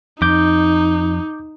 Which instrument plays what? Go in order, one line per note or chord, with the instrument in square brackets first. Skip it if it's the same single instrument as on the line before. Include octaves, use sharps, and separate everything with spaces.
[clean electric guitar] F2 [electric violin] D#4 [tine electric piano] D6 G6